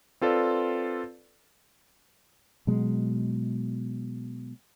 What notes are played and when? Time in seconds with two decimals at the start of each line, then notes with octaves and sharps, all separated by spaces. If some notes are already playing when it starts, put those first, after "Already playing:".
0.21 C4 F4 A4 B4 D5
2.67 B2 F#3 G#3